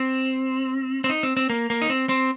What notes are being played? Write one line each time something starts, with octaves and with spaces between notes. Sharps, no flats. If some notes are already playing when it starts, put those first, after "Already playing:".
Already playing: C4
C4
D#4
C4
C4
A#3
A#3
D#4
C4
C4